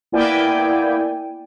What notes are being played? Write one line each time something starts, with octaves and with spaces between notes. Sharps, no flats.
A#3 B3 E4 D5 G5 G#5